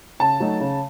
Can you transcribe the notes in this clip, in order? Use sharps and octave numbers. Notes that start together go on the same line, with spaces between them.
C#3 A5
F#3 A3 D#4
C#3